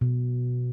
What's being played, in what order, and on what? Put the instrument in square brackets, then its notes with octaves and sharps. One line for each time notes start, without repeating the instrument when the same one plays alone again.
[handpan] B2